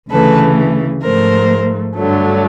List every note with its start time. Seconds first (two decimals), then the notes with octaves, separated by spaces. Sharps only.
0.10 D2 C#3 E3 A3 A4 B4
1.03 G#2 F3 A3 A#4 C5
1.96 G2 D3 F#3 A3